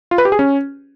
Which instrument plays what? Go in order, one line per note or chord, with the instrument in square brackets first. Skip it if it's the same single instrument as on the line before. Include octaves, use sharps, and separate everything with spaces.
[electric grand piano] F4
B4
G4
G#4
C#4